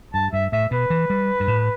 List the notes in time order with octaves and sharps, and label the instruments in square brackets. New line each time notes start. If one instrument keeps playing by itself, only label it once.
[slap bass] G2 [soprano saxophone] A5
[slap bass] G2 [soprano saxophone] E5
[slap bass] A2 [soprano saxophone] E5
[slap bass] B2 [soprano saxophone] B4
[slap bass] E3
G3
G2
A2